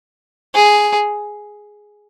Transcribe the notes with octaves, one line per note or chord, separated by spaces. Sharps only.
G#4